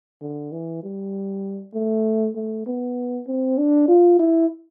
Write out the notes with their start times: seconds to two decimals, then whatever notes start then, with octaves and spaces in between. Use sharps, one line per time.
0.21 D3
0.52 E3
0.83 G3
1.74 A3
2.35 A3
2.66 B3
3.27 C4
3.58 D4
3.88 F4
4.19 E4